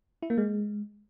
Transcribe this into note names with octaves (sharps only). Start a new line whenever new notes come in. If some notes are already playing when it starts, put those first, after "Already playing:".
E4
A#3
G#3